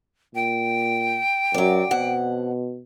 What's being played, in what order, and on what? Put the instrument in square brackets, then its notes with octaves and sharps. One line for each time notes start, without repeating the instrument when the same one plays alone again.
[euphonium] A#2 [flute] G5
[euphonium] F#2 [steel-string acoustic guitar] F#3 D5
[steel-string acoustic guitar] F2 F#5 [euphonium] B2